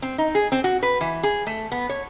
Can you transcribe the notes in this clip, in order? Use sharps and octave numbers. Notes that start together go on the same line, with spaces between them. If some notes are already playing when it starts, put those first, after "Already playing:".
C4
D#4
G#4
C4
F#4
B4
E3
G#4
A3
B3
C#5